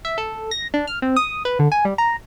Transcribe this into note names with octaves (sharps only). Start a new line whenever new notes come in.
E5
A4
A#6
D4
F6
C4
D#6
B4
D3
G#5
G3
A#5